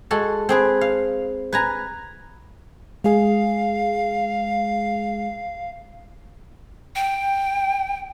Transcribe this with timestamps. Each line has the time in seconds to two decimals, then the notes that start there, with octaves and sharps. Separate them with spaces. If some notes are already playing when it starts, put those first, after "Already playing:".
0.11 G#3 F#4 A4
0.49 C4 G#4 B4
0.81 F5
1.53 B4 G#5 A#5
3.04 G#3 G#4 F5
6.96 G5